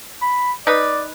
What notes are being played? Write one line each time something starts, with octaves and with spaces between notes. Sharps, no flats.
B5
D#4 B4 D5